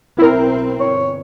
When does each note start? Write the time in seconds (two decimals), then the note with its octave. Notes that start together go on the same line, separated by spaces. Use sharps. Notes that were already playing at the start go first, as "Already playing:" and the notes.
0.18 B1 B2 C4 E4 A#4
0.80 G1 C#5